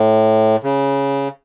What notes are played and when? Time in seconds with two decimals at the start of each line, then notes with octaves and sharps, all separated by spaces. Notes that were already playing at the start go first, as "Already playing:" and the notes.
Already playing: A2
0.63 C#3